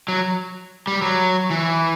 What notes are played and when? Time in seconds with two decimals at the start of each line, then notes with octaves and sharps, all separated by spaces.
0.08 F#3
0.87 G3
1.02 F#3
1.51 E3